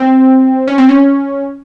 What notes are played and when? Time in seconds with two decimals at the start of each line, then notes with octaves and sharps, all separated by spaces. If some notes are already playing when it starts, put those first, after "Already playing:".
Already playing: C4
0.68 C#4
0.78 C4
0.89 C#4